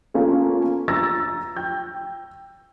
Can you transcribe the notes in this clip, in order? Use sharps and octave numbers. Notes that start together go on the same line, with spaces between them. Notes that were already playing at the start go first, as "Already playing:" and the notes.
A#3 B3 C#4 F4 G#4 A4
A#5 E6 A6 A#6
G5 G6